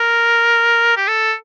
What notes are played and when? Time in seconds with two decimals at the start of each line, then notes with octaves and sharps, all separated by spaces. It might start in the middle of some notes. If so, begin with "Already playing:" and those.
Already playing: A#4
0.97 G4
1.08 A4